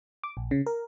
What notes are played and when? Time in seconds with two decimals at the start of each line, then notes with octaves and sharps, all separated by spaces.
0.24 D6
0.37 A#1
0.51 C#3
0.66 A#4